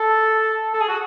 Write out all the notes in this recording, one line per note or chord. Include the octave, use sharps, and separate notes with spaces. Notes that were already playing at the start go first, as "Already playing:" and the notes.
Already playing: A4
A4
G#4
F#4